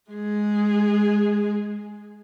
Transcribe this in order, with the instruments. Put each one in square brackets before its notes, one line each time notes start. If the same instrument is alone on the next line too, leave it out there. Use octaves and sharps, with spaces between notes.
[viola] G#3 G#4